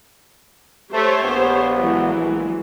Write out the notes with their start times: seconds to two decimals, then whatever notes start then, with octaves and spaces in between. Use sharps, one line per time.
0.93 A3 G4 C5 C#5
1.23 A#1 B3
1.77 E3 F#3 G#3
2.15 A#1